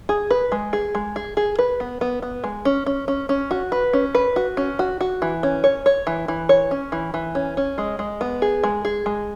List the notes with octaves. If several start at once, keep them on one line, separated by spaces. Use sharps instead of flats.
G#4
B4
G#3
G#4
G#3
G#4
G#4
B4
B3
B3
B3
G#3
C#4
C#4
C#4
C#4
F#4
B4
C#4
B4
F#4
C#4
F#4
F#4
E3
C#4
C#5
C#5
E3
E3
C#5
C#4
E3
E3
C#4
C#4
G#3
G#3
B3
G#4
G#3
G#4
G#3